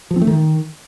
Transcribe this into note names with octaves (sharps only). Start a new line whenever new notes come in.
F3
C4
A3
D#3